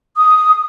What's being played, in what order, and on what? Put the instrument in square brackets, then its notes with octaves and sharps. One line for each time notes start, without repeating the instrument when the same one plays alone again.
[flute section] D#6